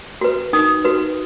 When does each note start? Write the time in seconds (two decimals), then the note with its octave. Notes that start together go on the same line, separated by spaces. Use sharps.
0.21 F#4 B4
0.53 D#4 D#6
0.85 F#4 B4